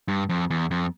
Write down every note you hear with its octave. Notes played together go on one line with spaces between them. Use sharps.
G2
F2
E2
F2